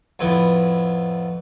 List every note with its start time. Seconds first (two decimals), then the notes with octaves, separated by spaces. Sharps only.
0.19 F2 A2 B3